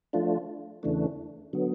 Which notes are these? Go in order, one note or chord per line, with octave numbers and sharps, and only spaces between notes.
F3 A3 D4 F4
E2 C#3 E3 A3 D4
D3 F#3 B3